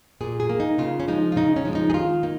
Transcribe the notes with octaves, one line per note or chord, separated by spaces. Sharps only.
A#2 G#4
G#4
A#3
D#4
C#3 F4
C#4
F3 G#3 D#4
F4
C#3 D#4
C#4
F3 G#3
D#4
G#4
D#3 F4
A#3 D#4